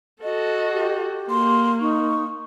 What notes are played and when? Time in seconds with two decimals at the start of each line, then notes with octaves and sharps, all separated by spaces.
0.23 F#4 A4 D#5
0.73 G4
1.30 A#3 C6
1.80 D#4 C#6